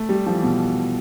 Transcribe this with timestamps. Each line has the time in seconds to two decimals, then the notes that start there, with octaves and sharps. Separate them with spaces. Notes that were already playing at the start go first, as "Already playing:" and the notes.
Already playing: A3
0.09 G3
0.27 F3
0.35 E3
0.43 B2